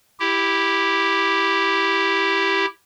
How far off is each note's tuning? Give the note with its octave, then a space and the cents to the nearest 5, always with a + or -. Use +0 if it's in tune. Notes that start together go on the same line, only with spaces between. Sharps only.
E4 +0 G4 +0